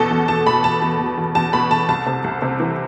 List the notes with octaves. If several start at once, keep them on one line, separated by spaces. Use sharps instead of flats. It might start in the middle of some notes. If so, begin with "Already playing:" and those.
Already playing: E2 B2 A4
E2
E2 A5
B2 B5
B2 A5
E2
B2
E2
E2 A5
B2 B5
B2 A5
C2 A5
C3
C2
C3
E3